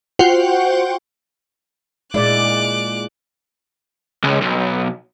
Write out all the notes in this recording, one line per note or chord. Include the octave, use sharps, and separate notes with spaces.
F4 F#4 C5 F#5 G5
A#2 G#3 E4 D5 D6 F#6
C#2
B1